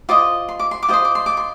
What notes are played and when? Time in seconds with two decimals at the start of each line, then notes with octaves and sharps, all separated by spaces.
0.09 F4 C5 D#5 D6
0.49 C6
0.59 D6
0.71 C6
0.83 D6
0.88 F4 C5 D#5 C6
1.05 D6
1.15 C6
1.26 D6
1.37 C6